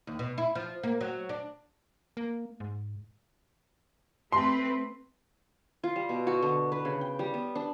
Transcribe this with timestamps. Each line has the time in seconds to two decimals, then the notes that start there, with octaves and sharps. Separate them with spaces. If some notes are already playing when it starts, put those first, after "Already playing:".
0.07 D#2
0.19 B2
0.38 E4
0.55 F3
0.83 A#3
1.01 F#3
1.29 D4
2.17 A#3
2.60 G#2
4.32 A3 C4 B4 C6
5.83 F4
5.96 G3
6.09 B2
6.27 F#4
6.42 D3
6.72 B4
6.85 C#3
7.01 G5
7.19 G3
7.34 B3
7.55 D4